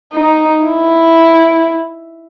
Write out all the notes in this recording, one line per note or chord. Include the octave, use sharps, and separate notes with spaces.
D#4
E4